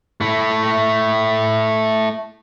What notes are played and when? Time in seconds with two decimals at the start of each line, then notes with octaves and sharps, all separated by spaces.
0.21 A3 E4